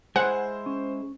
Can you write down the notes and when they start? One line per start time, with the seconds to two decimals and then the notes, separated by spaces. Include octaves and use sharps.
0.16 G#3 E4 G#4 C5 F#5 G#5
0.66 C#4